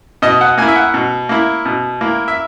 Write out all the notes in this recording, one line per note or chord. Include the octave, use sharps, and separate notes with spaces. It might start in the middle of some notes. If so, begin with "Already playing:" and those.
B2 D#5
F#5
A#3 E4 G#5
E5
F#5
B2
A#3 E4
B2
A#3 E4
E5